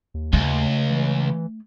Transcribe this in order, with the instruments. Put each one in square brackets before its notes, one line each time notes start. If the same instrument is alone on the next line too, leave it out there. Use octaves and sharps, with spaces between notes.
[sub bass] D#2
[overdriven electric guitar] C#2 [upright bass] A3
[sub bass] E3